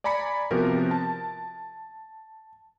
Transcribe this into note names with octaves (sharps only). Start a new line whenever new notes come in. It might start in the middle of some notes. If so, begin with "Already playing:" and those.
D5 G#5 A#5 B5 B6 C#7
C3 F3 B3 F#4 G4 A#4
A5